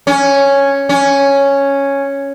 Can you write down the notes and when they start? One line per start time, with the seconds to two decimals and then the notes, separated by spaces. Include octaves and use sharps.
0.07 C#4
0.89 C#4